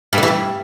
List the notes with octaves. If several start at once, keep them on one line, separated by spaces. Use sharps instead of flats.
G2
D3
E3
G2